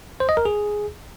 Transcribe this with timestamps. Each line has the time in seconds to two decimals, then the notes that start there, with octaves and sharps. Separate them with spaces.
0.20 C5
0.29 D#5
0.37 A#4
0.45 G#4